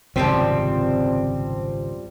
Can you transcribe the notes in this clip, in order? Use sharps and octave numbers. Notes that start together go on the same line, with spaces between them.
G#1 C#2 F#2 C3 F3 G3 C4